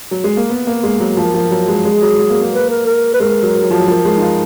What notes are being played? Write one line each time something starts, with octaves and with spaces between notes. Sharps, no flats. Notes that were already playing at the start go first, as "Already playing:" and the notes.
F#3
G#3
A#3
B3
A#3
G#3
F#3
F3 A#4
F3
F#3
G#3
G#3 G#4
F#3
F#3
A#3
A#3
B4
A#4
A#4
B4
G#3 A#4
F#3
F#3
F3
F#3
F3 A#4
G#3
D#4
F4